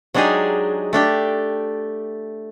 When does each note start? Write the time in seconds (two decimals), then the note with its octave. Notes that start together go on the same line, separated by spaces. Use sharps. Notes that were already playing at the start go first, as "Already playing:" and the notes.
0.14 F#3 G#3 D4 D#4 G4 G#4
0.93 A3 D4 G4 G5